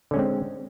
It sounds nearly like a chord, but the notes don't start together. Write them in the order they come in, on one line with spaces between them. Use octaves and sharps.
D3 C#4 G#3 C4